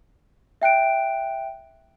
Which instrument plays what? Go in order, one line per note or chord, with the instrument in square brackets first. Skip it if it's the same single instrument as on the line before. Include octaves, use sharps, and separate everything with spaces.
[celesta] E5 G5 F#6 D7